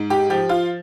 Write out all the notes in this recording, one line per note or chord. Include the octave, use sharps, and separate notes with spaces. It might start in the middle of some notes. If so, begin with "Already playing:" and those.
Already playing: G#2
G4
F3 G4
F4